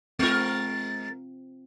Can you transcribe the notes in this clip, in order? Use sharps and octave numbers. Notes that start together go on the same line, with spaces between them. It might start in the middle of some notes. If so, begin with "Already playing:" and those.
G#3 C4 F4 A#4 A6